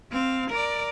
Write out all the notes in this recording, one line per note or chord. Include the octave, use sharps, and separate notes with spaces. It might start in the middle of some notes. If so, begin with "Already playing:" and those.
C4 F5
A#4 D5